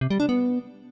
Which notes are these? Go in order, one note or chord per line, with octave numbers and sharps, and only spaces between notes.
C3
G3
D4
B3